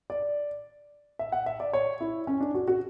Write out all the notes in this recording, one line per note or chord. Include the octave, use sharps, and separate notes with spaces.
D5
E5
F#5
E5
D5
C#5
E4
C#4
D4
F#4
F#4